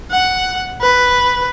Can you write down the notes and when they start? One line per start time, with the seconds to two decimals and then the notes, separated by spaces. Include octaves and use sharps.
0.11 F#5
0.81 B4